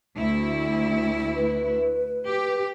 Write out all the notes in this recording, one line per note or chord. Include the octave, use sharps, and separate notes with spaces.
D2 E4
B4
G4